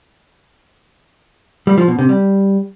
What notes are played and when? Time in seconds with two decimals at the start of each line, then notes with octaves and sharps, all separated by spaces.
1.67 G3
1.78 F3
1.88 B2
1.99 C3
2.09 G3